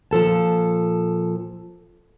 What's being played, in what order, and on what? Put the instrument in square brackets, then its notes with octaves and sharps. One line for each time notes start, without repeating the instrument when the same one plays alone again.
[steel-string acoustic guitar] A#2 F3 A4 A5